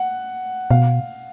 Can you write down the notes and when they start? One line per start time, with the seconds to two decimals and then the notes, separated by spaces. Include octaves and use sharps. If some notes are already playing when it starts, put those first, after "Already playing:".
Already playing: F#5
0.71 B2 F5